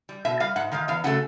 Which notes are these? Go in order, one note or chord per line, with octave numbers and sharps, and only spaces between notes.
G3
B2 E5
G3 F5
G#2 F#5
D#3 G#3 F5
E2 F5
C#3 F#3 A3 F#5